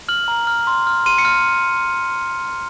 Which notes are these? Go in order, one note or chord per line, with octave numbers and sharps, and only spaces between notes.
F6 F#7
A#5
F6
C6
F6
C6 D#7
C#7
F6